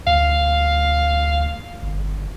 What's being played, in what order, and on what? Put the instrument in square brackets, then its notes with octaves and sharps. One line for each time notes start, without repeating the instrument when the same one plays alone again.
[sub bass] D2 [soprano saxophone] F5
[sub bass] G1